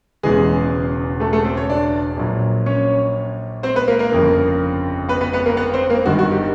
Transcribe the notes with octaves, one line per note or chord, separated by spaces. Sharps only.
E1 E2 C#3 E3 G#3 G#4
A3 A4
A3 A4
C4 C5
C#4 C#5
D4 D5
A#1 A#2 F#3
C#4 C#5
C4 C5
B3 B4
A#3 A#4
A#3 A#4
G1 F2 C#3 F3
B3 B4
B3 B4
B3 B4
A#3 A#4
B3 B4
C4 C5
A#3 A#4
G1 G2 D#3 F#4
F#4
G4